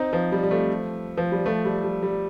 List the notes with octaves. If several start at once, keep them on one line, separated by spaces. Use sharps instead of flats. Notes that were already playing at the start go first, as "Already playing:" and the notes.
Already playing: C4 D#4
F3
G3
G3
F3 A3
F3
G3
F3 A3
G3
G3
G3